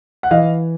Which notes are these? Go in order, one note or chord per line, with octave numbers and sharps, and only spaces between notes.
F#5
E3 D#5 F5